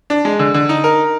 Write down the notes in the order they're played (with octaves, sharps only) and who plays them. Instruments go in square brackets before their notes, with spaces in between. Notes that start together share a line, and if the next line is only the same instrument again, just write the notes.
[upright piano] D4
G#3
D3
D3
D#4
A#4